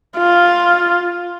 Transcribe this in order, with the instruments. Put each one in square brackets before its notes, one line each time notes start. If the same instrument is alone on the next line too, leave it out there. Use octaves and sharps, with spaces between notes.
[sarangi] F4